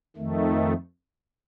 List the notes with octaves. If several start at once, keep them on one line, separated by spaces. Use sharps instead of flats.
F2 D#3 A3